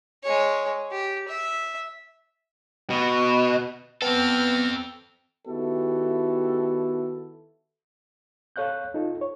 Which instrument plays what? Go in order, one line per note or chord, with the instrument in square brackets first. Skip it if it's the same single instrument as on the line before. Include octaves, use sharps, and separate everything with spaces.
[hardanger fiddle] G#3 C#5
G4
E5
[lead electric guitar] B2
[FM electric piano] B3 [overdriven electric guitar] C4 A4 [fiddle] G5 F6
[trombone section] D#3 B3 E4 F#4 G4 A4
[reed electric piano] A4 C#5 F5 F#6 G6
D#4 F4 A4
C#5